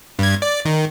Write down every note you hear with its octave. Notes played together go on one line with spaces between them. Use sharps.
G2 G#6
D5
D#3